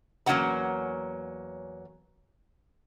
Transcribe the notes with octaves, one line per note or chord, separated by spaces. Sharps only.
E2 F#3 A#3 C#4 F#5 A#5